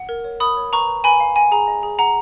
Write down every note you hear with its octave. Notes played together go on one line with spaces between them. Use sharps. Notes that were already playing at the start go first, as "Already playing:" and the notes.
Already playing: F#5
A#4
C#5
A#4 B5 D#6
C#5
B4 A#5 C#6
B4
B4 G#5 B5
F5
F#5 G#5
G#4 A#5
D#5
G#4
F#5 A#5